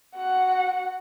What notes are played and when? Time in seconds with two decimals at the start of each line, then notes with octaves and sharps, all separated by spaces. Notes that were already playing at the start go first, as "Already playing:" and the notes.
0.15 F#4 F#5